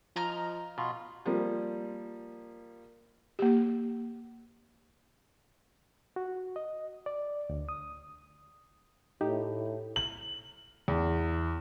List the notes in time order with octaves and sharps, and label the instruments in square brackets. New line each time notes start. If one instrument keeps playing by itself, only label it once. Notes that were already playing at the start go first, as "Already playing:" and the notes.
[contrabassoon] F3 [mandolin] D#5 A#5 F6
[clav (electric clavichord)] B2 [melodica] F4
[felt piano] F3 G3 A#3
[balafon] A#3 G4
[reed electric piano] F#4
D#5
D5
D2
D#6
[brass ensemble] A2 [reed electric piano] D#4 G4
[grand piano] F#7
E2